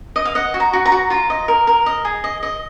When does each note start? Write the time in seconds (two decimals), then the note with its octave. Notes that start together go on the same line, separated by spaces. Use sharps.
0.16 D#5
0.25 F5
0.35 D#5 F#5
0.54 F#4
0.60 A#5
0.73 F#4
0.86 A#5
0.92 F#4
1.10 F4 A#5
1.30 D#5
1.48 A#4
1.67 A#4
1.86 D#5
2.05 G#4
2.24 D#5
2.43 D#5